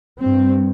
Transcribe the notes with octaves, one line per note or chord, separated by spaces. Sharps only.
G2 C4